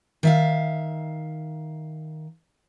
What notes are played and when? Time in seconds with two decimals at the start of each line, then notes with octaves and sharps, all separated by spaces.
0.23 D#3 E5 F5